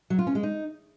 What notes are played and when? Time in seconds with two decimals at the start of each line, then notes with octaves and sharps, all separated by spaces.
0.10 F#3
0.19 F4
0.27 C#4
0.35 G#3
0.43 D#4